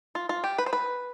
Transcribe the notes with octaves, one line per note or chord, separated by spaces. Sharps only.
F4
F4
G4
B4
C5
B4